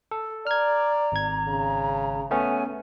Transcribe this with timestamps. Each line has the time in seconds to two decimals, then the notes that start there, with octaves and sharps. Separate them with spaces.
0.11 A4
0.47 D5 A#5 F6 G#6
1.12 G#1 G#6
1.48 C#3
2.31 A3 B3 C#4 G#5